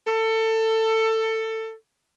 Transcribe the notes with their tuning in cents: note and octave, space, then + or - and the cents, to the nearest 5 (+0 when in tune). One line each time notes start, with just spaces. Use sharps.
A4 +20